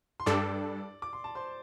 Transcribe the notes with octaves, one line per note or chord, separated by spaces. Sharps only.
C6
G2 G3 D4 A4 D5 D6
D6
C6
A5
C5 C6